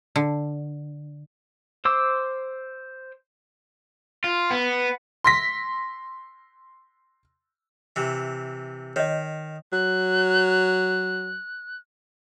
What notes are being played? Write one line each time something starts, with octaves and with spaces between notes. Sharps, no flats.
D3
C5 C6 D6 E6
F4
B3
C6 A#6 B6
C3 E3
D#3 C#5 D#5
F#3 F#6